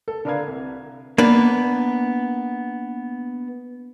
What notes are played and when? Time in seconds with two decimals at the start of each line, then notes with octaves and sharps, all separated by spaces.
0.08 A4
0.25 D3 D4 A#4 B4 F5 G#6
0.48 C2
1.18 A#3 B3 D4 B4